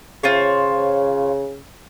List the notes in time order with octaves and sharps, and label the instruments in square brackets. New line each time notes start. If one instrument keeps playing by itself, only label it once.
[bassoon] C#3 [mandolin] F4 C5 C#5